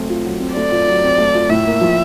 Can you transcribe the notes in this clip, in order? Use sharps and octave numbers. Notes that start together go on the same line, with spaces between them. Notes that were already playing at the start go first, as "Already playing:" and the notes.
Already playing: F#3 A3 C4
F4
F#3
C4
A3 D5
F4
F#3
C4
A3
F4
A2 E5
A#3
F3